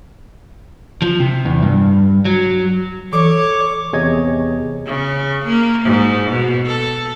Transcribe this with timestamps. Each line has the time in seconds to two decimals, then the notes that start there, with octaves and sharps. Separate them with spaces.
1.02 F3
1.20 C3
1.45 E2
1.62 G2
2.25 F#3
3.13 E3 A4 C#5 D6
3.93 E2 C3 G#4 C#5 D#5 G#6
4.87 C#3
5.45 A#3
5.86 G#2
6.31 B2
6.66 A4